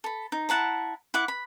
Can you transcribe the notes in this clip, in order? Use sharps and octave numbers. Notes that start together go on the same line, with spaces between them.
A4 B5
D#4
E4 F#5 A5 A#5
E4 F#5 D6
B5